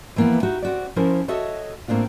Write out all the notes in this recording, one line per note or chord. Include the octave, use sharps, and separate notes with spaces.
E3 F3 A#3 B3 E4
D#4 E4 F#4 G4
C4 F#4 D5
F3 C#4 E4 A#4 C5
F#4 A4 C#5 D#5 E5
A2 A#3 C4 D4 F4